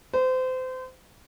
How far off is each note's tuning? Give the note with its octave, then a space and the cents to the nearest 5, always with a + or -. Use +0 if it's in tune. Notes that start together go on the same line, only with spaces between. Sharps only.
C5 -30